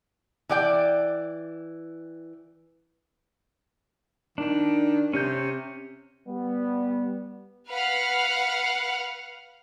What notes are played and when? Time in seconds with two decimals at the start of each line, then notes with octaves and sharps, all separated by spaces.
0.49 E3 D5 G5
4.38 D#3 D4
5.13 C3 C#4 G6
6.27 G3 B3
7.70 B4 F5 F#5 F6